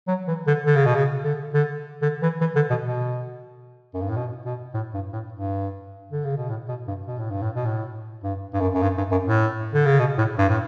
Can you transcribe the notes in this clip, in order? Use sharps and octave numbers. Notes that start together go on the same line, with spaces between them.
F#3
E3
D3
D3
C#3
B2
C#3
D3
D3
D3
E3
E3
D3
B2
B2
F#2
G2
A2
B2
B2
A2
G2
A2
G2
D3
C#3
B2
A2
B2
G2
B2
A2
G2
A2
B2
A2
G2
G2
F#2
F#2
G2
G2
F#2
A2
D3
C#3
B2
A2
G2
A2